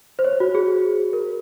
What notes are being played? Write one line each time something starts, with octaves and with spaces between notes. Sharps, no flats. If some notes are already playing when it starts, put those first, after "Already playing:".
C5
C#5
F#4
G#4
A#4